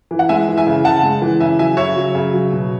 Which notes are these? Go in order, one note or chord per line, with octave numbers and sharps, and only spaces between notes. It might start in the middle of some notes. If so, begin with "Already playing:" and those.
E3
F#5
G#3 E5 G#5
E3
E5 G#5
C#3
C#3 F#5 A5
G#3
E3
C#3 E5 G#5
F#3 E5 G#5
C#3 C#5 E5
F#3
C#3
F#3
B2